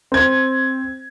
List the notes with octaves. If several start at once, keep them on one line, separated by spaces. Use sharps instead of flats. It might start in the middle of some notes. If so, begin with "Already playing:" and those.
C4 G#6